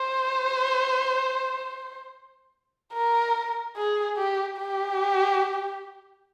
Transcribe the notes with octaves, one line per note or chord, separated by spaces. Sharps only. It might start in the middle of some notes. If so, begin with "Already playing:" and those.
Already playing: C5
A#4
G#4
G4
G4